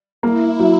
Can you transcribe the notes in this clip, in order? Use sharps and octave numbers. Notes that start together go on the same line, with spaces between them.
A#3 E4
F#3